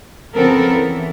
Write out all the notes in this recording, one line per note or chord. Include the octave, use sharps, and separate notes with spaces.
C#3 F3 B3 C4 A4 A#4
E3